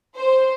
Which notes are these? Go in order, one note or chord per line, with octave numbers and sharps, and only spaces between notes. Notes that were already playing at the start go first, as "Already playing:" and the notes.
C5